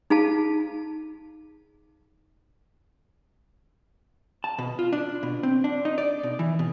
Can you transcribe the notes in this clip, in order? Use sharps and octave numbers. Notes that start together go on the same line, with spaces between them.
D#4 G#4 F5 A5
A5
B2
F4
D4
B2
C4
D4
D#4
D5
B2
E3
B2